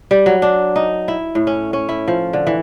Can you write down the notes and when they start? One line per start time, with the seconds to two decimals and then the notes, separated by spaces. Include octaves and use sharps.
0.11 G3
0.26 F#3
0.42 D4
0.76 D#4
1.08 E4
1.35 A2
1.47 C#4
1.73 C#4
1.89 E4
2.08 F3
2.33 D3
2.47 E3